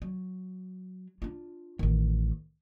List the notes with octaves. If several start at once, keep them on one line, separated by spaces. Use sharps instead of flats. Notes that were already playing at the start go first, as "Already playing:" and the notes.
F#3
D4 F4
A1 D#3